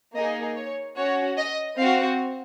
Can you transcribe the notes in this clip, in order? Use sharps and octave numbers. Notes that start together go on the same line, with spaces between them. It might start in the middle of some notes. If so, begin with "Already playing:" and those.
A#3 D#4 G#4 D#5
C#5
C#4 F#4 C#5
D#5
C4 F#4 F5